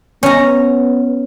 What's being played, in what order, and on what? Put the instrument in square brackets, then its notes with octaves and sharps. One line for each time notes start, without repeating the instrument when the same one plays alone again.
[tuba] B3 [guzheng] C#4 A#5